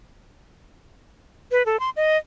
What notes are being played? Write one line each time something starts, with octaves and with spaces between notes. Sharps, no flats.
B4
A4
C6
D#5